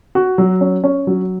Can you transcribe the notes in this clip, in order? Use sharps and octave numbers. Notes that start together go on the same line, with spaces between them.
F#4
F#3
C#4
C#4
F#3